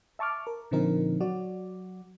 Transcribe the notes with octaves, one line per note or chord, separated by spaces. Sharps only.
E5 A5 C#6 D6 F6
A#4
A#2 D3 F3 C4 D#4 A#4
F#3 F#4 D5